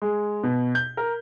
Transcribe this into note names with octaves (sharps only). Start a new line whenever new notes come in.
G#3
B2
G6
A#4